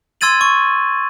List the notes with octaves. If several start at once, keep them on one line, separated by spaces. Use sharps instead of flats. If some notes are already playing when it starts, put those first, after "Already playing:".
C6 E6 G#6 A6 D#7 F#7
C#6